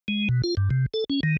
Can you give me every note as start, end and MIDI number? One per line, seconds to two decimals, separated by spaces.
0.08 0.28 56
0.29 0.42 47
0.44 0.55 65
0.57 0.69 43
0.70 0.86 48
0.94 1.04 69
1.10 1.20 61
1.23 1.37 51